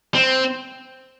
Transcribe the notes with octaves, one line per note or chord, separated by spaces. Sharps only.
C4